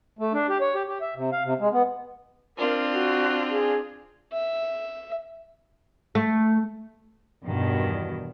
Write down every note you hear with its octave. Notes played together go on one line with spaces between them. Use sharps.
A3
D4
G4
C#5
G4
G4
E5
C3
F5
C3
G#3
B3
C4 D4 F4 A#4
F#4
G#4
E5
A3
E2 G2 B2 D#3